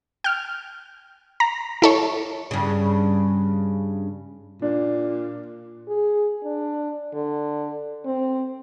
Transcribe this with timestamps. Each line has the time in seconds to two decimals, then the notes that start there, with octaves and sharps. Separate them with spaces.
0.24 G5 F6
1.40 A#5
1.82 E4 A4 C#5
2.51 G2 C#3
4.62 A#2 D4
5.88 G#4
6.43 D4
7.14 D3
8.05 C4